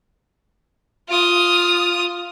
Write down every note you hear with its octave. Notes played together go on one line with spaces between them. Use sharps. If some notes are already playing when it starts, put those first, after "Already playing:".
F4 D#6